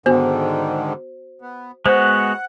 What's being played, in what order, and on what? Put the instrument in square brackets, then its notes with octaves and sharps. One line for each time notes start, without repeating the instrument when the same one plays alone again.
[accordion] G#2 D3 D#3 [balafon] B3 G#5 [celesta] F#4 C5
[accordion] B3
[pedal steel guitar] G#3 B3 F#4 [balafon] C5 [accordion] F#5